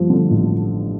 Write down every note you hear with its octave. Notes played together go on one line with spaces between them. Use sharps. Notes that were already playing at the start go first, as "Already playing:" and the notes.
Already playing: G2 F3
D3
A1